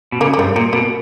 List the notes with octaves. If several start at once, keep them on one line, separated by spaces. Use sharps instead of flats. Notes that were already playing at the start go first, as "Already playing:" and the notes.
B2
C#3 A#3
A#3
G2 G3
A#2 A#3
B2 A#3